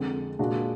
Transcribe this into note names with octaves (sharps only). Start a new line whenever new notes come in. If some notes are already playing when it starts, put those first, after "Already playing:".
Already playing: F2 D3 G#3
A#2 G#3 D4 F#4